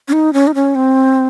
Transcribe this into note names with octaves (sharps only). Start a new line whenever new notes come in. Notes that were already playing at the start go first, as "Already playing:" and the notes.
C#4
D#4
C#4
D#4
C#4
C4